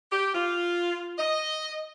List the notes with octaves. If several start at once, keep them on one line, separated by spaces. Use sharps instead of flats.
G4
F4
D#5